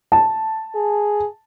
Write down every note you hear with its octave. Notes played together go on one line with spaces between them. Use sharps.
A5
G#4